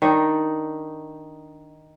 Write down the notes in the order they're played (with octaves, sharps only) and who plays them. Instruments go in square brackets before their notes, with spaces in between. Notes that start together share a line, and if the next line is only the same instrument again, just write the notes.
[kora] D#3 D4 D#4